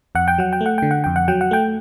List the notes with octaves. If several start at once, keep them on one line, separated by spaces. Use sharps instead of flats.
F2 F#5
G5
F#3 F#5
G5
A3
F#5
D3 G5
F#5
F2 G5
F#5
F#3 G5
F#5
A3 G5